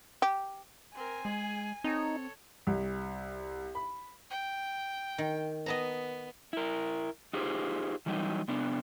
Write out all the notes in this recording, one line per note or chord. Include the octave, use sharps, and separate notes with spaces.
G4
C4 A#4 G#5
G#3 G#4
C4 D#4 A4 C#5
C2
B5
G5
D#3
B3 D#5 A5 A#5
E4 A#4
D#4 F4 G4 G#4 C5
E3 F#3 G3 D#4
C3 B3 D4